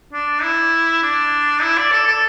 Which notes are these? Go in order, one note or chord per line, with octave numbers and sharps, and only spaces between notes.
D4
E4
D4
E4
D5
A4
A4